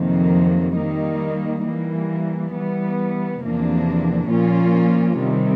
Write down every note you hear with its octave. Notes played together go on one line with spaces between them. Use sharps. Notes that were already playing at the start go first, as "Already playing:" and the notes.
Already playing: F2 C3 D#3 F#3 A#3
D#3 G3 A#3 D#4
E3 G3 A#3
E3 G3 B3
E2 C3 F3 A#3 D4
A#2 F3 A#3 C#4 F4
C3 D#3 G3